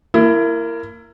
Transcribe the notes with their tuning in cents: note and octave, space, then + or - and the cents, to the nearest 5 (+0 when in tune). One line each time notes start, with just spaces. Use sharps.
A#3 -15 E4 +20